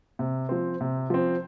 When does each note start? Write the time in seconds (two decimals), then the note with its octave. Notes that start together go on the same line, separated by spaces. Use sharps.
0.19 C3
0.49 F3 C4
0.81 C3
1.10 F3 C4